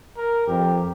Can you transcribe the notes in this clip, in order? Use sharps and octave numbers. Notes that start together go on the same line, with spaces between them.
A#4
F2 G4